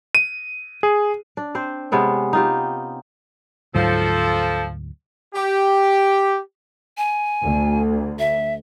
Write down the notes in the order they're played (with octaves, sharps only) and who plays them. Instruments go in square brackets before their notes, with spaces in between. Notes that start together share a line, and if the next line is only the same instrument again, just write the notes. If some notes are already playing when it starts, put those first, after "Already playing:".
[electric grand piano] D#7
G#4
[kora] D4
C4 C5
C3 G#3 B3 C#4
D#4 F4 G4
[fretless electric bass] D2 G#2 F#3 [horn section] F3 A4
[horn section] G4
[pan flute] G#5
[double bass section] D2
[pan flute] E5